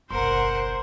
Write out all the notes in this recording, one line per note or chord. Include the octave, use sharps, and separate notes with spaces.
F#1 B1 A#4 C5 F#5 C6